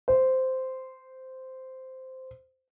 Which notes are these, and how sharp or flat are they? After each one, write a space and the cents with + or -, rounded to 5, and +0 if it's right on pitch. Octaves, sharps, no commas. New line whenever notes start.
C5 -10